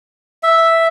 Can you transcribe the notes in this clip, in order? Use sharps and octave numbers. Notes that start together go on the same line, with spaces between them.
E5